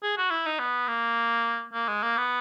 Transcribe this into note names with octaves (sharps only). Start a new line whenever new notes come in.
G#4
F#4
E4
D#4
B3
A#3
A#3
G#3
A#3
B3